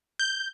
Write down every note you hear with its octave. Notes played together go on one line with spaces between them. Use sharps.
G6